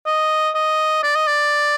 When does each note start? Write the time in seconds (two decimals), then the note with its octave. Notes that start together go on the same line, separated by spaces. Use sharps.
0.06 D#5
0.55 D#5
1.03 D5
1.16 D#5
1.27 D5